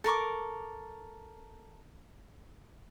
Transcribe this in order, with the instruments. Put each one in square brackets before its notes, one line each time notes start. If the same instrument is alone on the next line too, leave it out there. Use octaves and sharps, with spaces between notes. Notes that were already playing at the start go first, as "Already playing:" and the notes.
[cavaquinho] A4 A#4 C#6 D6